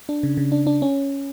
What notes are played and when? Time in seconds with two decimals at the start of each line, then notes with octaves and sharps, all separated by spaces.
0.09 D4
0.23 C#3
0.37 C#3
0.52 D4
0.67 D4
0.82 C#4